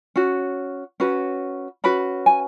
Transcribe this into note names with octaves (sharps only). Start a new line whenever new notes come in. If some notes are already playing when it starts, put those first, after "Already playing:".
C#4 F#4
C#4 F#4 B4
C#4 F#4 B4 B5
G#5